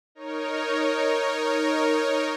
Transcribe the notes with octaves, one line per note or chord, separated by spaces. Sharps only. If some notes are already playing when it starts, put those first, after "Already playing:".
D#4 A#4 C#5